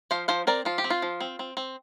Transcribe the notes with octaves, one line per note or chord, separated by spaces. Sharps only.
F3 C5 F5
F3 C5 F5
C4 A#4 D5
F3 F4
G4
C4
F4
F3
C4
C4
C4